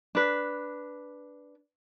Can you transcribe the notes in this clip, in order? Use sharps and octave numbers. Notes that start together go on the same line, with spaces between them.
D4 B4